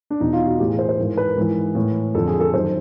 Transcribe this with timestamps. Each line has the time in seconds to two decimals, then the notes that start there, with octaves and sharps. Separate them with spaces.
0.10 D4
0.20 E2 B2 D#4
0.33 F4
0.46 F#4
0.59 A2 E3 G4
0.69 G#4
0.79 C5
0.89 C5
0.98 G#2 E3 A#4
1.17 B4
1.27 A#4
1.37 G#2 E3
1.75 A2 E3
2.15 F2 D3 A4
2.28 G#4
2.40 A4
2.53 F#2 D#3 C5